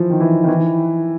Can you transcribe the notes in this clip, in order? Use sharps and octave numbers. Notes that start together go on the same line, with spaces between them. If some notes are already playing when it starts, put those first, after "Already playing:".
Already playing: E3 F3
D#3
E3
D#3
E3